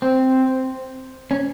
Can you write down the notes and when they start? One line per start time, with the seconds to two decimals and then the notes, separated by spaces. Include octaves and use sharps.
0.02 C4
1.31 C#4